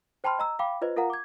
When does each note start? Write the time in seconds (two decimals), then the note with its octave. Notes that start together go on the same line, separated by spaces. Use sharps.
0.24 C5 G5 A5 B5 C6 F6
0.39 D#5 A#5 E6
0.59 F5 G5 B5 D6
0.81 F4 B4 C5 D#5
0.96 F4 A#4 F5 F#5 A#5
1.10 D6 G#6